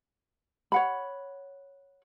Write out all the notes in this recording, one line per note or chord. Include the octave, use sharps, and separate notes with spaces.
C#5 F#5 B5